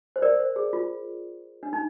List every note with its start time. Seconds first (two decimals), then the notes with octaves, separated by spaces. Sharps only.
0.16 C5
0.22 A#4 D5
0.39 C5
0.56 G#4
0.73 F4
1.63 D4
1.73 D#4